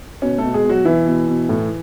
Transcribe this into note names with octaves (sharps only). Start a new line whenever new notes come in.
B2 C#4
B2 A3 A4
G#3 G#4
B2
F#3 F#4
B2 E3 E4
B2
B2
A2